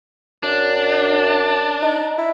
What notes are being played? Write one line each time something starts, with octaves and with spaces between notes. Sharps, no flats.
F#2 D4
D#4
E4